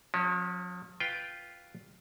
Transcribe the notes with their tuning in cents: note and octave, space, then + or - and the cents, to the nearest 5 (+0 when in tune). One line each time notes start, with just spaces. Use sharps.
F3 +45 C#4 +0
F4 +0 B4 +0 G5 +0